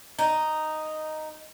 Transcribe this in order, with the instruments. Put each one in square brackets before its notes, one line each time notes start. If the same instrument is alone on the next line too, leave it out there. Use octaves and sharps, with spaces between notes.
[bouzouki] D#4